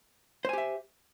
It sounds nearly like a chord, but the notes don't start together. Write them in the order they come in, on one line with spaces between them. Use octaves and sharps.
C5 G#5 G4 E5